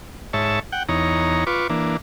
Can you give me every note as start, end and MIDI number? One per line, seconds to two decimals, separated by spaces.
0.33 0.60 44
0.33 0.60 73
0.33 0.60 76
0.33 0.60 81
0.72 0.83 78
0.72 0.83 79
0.89 1.44 40
0.89 1.44 63
0.89 1.44 73
0.89 1.44 82
1.47 1.67 65
1.47 1.67 71
1.47 1.67 85
1.47 1.67 86
1.70 1.97 52
1.70 1.97 58
1.70 1.97 62